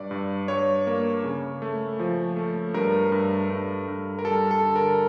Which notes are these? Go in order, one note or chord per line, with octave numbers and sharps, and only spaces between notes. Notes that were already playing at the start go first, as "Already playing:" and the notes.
Already playing: G2 D5
G2
G2 C#5
A#3
C#3
A3
F3
A3
G2 A#4
G2
G2
G2
A#4
G3 A4
A4
D3
A#4